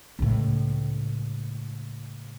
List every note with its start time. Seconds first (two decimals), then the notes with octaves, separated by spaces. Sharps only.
0.19 C#2 A2